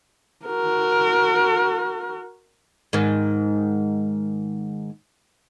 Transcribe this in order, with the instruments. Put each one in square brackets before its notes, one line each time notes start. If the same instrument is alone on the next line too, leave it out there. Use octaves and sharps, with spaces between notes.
[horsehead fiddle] F#4 A#4
[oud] G#2 D#3